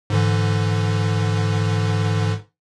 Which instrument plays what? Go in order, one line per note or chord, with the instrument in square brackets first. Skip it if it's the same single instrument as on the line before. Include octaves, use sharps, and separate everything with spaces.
[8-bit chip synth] G#2 D3 E3